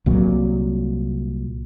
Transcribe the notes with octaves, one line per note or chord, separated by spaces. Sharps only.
C2 A#2 F#3